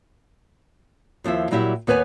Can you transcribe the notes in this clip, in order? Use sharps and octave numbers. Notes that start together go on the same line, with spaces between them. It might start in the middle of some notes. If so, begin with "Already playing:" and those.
D#2 F3 E4 E5
A#2 F#3 G3 E4 G4 E5
D#2 B3 B4 C#5 G#5